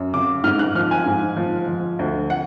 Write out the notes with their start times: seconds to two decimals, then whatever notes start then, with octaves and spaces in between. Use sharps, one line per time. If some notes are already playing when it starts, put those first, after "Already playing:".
Already playing: F#2
0.14 C#3 D6
0.44 G#2 F6
0.59 F#6
0.75 F3 F6
0.91 G#5
1.06 G#2
1.37 F3
1.68 F3
1.99 D2
2.30 F#5